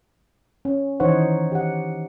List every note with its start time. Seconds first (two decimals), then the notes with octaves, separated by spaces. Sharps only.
0.65 C#4
1.00 D#3 E3 D#4 C5 C#5 F#5
1.52 G4 F#5